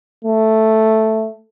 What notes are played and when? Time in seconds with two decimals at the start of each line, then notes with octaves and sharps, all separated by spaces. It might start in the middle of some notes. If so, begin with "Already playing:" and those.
0.25 A3